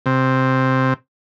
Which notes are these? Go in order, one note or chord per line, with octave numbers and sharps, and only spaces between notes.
C3